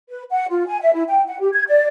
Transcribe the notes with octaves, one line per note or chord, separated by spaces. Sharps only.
B4
F#5
F4
G#5
E5
E4
G5
F#5
G4
G#6
D5